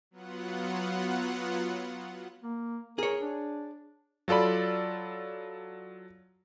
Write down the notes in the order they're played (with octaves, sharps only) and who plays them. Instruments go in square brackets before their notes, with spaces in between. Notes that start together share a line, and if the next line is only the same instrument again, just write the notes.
[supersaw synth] F#3 B3 F4 F#5
[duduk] A#3
[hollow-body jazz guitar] G#4 C#5 [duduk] A#4
[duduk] D4
[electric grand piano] F#3 F4 A4 D5 B5